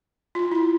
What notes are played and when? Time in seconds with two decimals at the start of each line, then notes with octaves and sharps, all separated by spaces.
0.35 F4
0.52 E4